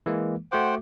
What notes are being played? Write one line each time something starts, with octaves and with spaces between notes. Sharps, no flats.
E3 G#3 A#3
A3 F#4 C5 F#5 G5 D6